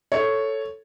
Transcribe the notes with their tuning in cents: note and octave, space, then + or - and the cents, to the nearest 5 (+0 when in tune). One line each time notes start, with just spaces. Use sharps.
A4 +0 C#5 +0